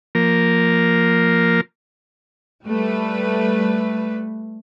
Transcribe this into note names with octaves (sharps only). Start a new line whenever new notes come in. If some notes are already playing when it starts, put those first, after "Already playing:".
F3 A#3 A#4
G3 A3 B4